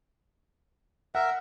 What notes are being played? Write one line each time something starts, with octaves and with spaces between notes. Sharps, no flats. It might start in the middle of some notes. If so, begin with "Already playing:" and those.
A#4 E5 F#5